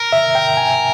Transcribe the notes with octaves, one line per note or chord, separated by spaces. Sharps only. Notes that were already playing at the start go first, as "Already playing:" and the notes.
Already playing: A#4
E5
G5
G#5